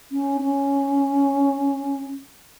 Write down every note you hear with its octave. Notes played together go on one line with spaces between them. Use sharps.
C#4
C#4